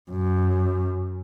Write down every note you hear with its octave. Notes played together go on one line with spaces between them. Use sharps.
F#2